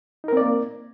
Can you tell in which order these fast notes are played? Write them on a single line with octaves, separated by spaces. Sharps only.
D#4 A#4 C4 D5 A#3